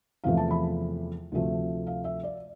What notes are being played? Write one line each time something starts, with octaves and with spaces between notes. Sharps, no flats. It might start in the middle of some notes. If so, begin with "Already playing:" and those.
E2 C3 F3 A3 F5
A5
B5
D2 C3 F3 A3
F5
E5
D5